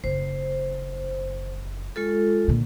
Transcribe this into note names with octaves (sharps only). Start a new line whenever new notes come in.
F#1 C5
G#3 F4 A4
A#2 D3